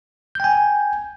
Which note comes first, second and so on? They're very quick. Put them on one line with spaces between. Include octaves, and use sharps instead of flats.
G6 G5 G#5